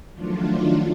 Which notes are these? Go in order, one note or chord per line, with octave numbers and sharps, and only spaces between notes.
D#3 F3 F#3 A3 D4 F4